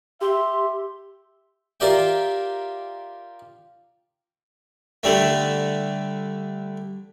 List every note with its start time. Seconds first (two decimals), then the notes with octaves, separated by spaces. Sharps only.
0.21 G4 E5 C6
1.80 F4 G4 A#4 D5 E5 G5
5.03 D3 G3 A3